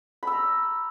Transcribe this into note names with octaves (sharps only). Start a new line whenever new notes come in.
A#5 B5 E6